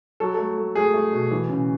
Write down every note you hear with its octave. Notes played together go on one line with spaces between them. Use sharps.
F#3 A4
A3 A4
A3
A3 G#4
A3
B2
E3
C#3